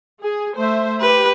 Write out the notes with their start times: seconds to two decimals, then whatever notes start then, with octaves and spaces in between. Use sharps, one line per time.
0.22 G#4
0.55 A3 C5 E5
1.01 G4 B4